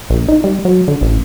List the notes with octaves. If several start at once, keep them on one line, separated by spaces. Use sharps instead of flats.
A#1
D#4
G3
F#3
D3
A1